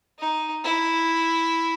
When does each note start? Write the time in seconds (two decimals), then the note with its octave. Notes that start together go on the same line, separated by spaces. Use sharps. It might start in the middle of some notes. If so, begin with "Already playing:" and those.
0.19 D#4
0.64 E4